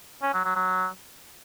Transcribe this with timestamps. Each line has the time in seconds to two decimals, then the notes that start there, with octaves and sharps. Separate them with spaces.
0.22 C#4
0.33 F#3
0.45 F#3
0.56 F#3